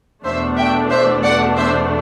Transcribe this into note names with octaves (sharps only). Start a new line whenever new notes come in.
E2 B2 A3 D4 C5 E5
E5 G5
C5 E5
D5 F#5
C5 E5